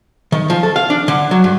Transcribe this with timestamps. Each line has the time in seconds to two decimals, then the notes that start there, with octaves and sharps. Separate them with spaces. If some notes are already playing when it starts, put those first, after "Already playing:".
0.32 D#3
0.50 F3
0.63 A4
0.76 F5
0.90 D4
1.08 D3
1.31 F#3
1.44 G2